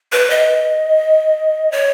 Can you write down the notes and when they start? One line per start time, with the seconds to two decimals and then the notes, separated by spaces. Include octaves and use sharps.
0.12 B4
0.30 D#5
1.72 C#5